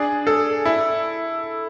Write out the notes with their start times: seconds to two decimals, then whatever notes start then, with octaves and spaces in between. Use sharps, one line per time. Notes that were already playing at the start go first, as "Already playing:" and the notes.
Already playing: D4 G#4
0.27 A4
0.66 E4